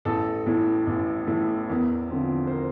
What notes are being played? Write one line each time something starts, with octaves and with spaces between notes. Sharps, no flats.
A1 A4
A2 E3
A1
A2 E3
E2 A#4
D3 F3 C4
C5
A#4